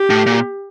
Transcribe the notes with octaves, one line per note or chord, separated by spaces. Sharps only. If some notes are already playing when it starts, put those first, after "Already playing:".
Already playing: G4
A2
A#2